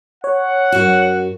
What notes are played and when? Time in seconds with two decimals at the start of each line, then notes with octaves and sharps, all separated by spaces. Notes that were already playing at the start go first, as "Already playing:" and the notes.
0.24 C#5 F#5
0.72 F#2 F#4